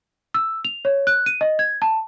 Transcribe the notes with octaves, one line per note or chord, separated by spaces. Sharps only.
E6
F7
C#5
F#6
D#7
D#5
G#6
A5